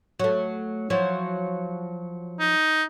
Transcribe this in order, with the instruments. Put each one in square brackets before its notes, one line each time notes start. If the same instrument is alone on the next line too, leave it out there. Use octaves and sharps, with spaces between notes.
[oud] F#3 A3
F3 F#3 E4
[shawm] D#4